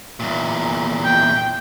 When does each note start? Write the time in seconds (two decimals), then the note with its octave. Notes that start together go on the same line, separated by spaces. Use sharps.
0.20 E2 A#2
1.04 G5